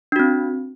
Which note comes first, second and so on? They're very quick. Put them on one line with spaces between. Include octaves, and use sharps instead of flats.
D4 F#4 C4